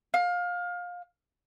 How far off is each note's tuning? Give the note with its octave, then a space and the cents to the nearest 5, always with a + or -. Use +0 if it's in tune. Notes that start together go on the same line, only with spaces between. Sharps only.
F5 +25